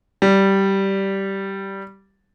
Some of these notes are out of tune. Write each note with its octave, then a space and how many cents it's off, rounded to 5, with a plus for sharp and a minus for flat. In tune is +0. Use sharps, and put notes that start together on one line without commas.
G3 -10